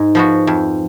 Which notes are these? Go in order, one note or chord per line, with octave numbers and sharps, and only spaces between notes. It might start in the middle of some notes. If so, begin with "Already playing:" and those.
Already playing: G#2
F3 B3 F#4
F2